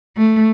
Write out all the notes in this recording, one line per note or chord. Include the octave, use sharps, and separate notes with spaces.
A3